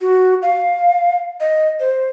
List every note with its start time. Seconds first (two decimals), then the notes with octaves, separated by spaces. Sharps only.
0.01 F#4
0.42 F5
1.40 D#5
1.80 C5